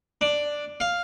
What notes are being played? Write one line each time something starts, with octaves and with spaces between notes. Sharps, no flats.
D4
F5